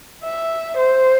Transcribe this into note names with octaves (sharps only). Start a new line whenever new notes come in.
E5
C5